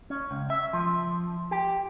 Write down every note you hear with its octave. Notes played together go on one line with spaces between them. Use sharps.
C#4
C#2
E5
F3
G4